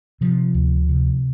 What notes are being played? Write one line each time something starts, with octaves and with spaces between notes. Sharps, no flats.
C3 F3
D2
C3